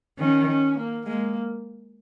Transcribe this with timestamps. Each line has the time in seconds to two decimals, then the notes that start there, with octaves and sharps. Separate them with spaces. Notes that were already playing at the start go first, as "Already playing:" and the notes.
0.19 D#3 C#4
0.48 C#4
0.78 A#3
1.06 G#3 A#3